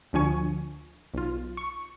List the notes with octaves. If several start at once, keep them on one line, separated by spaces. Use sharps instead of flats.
D2 D3 F3 G#5 C#6
B1 F4
C#6